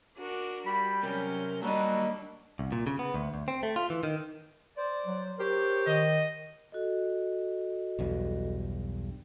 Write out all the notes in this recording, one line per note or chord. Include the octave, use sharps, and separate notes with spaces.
D4 F#4 A#4
G3 B5
C3 F#3 C#4 A#4 G6
F#3 G3 A#3 D4 D#5
C2
A#2
C#3
B3
D2
D2
C4
A3
F4
E3
D#3
C5 D5
F#3
G4 A#4 C5 C#5
D#3 D#5
F#4 A4 D#5
B1 E2 G2